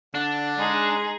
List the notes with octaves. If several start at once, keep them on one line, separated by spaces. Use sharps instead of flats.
D3 D4
G#3 D#4 G#4